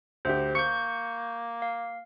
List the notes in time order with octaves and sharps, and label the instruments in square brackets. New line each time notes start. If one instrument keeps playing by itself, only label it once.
[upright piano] D2 G4 [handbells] C5
[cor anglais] A#3 [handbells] C#6 G6 [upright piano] C#7
[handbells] F5